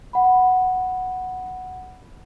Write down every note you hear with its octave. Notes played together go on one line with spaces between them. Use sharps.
F#5 B5